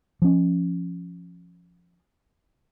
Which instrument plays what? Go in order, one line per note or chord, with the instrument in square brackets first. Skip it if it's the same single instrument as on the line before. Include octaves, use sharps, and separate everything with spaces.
[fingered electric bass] F3 C#4